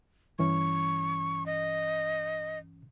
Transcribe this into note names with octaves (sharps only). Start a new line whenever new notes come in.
G2 E3 C#4 C#6
D#5